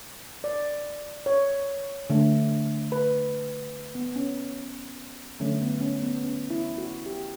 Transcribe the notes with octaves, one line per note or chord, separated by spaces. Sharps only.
D5
C#5
D3 A3
B4
B3
C#4
D3 F#3 A3 C#4
B3
C#4
B3
C#4
E4
F#4
G4